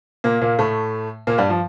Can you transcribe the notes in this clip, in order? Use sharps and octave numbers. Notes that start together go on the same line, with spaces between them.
A#2 A#3
A#2 A#3
A2 A3
A#2 A#3
G2 G3
F3